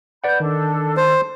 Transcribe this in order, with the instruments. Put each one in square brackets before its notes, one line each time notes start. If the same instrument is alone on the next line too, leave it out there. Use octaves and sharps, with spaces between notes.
[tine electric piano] B4 D5 F#5 [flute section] B5 G6
[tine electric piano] D#3 [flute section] D4 A4
[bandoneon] C5